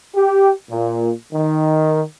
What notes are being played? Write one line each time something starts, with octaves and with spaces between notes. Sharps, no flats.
G4
A#2
D#3